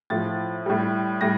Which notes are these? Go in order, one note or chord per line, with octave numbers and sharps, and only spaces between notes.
A2 F3 A6
A2 G3
A2 G3 A#6